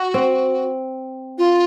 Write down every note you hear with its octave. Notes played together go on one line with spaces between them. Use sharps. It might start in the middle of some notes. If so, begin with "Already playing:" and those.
Already playing: F#4
C4
F4